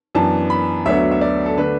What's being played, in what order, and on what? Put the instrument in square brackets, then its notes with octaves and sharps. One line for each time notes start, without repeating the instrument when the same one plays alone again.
[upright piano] F#2 E3 B3 D4 A5
B5
D2 D3 F#3 B3 D4 E5
E5
D5
A4
D3 A3 D4 B4